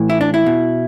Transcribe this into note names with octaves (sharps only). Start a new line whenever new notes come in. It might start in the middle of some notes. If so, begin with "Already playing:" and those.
Already playing: A2 E3
E4
D4
E4
B2